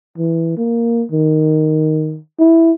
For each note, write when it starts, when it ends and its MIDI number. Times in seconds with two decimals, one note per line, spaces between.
0.18 0.56 52
0.57 1.04 58
1.12 2.19 51
2.39 2.72 64